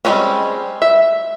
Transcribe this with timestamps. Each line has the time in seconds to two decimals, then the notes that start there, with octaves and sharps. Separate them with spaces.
0.05 G3 G#3 A#3 C4 C#4
0.82 E5